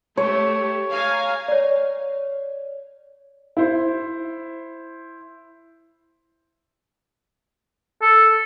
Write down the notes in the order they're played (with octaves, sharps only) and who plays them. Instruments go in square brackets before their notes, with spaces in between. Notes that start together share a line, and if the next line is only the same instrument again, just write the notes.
[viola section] A3 G4 [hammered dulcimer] C#5
[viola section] F5 G#5 A#5
[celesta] C#5 D5
[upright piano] E4 C5
[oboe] A4